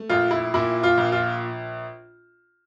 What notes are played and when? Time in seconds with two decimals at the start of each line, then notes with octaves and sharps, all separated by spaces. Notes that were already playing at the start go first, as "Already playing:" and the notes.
Already playing: A3
0.09 A#1 F4
0.31 E4
0.54 A#2 E4
0.83 F4
0.97 A#1
1.12 F4